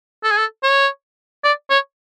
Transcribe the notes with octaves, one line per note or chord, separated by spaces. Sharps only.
A4
G#4
A4
C#5
D5
C#5